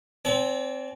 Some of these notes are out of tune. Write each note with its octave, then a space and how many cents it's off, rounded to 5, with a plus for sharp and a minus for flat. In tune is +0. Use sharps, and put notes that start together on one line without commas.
C4 +0 D5 -45 G#5 +45